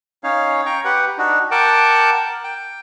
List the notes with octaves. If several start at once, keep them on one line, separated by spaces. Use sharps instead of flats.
C#4 D#4 C#5 F5
G5 A#5 C#6
G4 B4 F#5
D4 D#4 F#4
A#4 F#5 G5 A5 D6
G5